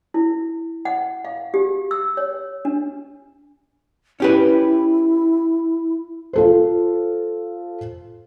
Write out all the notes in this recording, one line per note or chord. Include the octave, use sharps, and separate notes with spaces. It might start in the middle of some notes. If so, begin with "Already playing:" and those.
E4
F#5
F5
G4
E6
C#5
D4
C#4 E4 G4 B4
F4 A4 C5